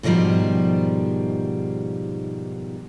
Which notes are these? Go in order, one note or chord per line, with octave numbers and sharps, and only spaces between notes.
G#2 B2 D#3 F3 G3